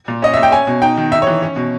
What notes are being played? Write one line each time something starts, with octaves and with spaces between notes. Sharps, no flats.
A#2
C#4 D#5
A#2 E5
G5
C#4 G#5
B2
D#4 G5
D#3
D#4 E5
C#5
E3
C#4
B2